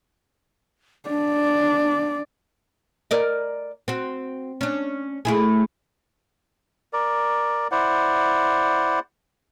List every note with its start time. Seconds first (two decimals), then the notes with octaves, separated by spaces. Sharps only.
1.09 D4 D5
3.11 A#4 D5 D#5
3.88 C4 F#4
4.61 C#4 D4
5.25 A3 E4 G#4
6.93 A#4 D5
7.72 E4 C5 D5 F#5